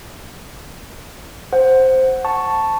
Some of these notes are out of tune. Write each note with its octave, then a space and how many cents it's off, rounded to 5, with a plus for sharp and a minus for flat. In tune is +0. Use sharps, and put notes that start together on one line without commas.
C5 +0 F#5 +5
A5 +0 C#6 +0